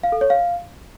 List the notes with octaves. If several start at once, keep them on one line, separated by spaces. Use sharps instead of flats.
F5
A4
C#5
F5